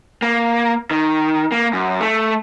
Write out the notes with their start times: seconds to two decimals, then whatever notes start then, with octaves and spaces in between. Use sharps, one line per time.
0.22 A#3
0.91 D#3
1.52 A#3
1.73 F#2
2.01 A3